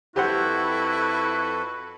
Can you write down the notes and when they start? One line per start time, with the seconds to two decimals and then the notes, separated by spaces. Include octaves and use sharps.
0.16 F2 E4 F#4 G4 A4 B4 C5 F#5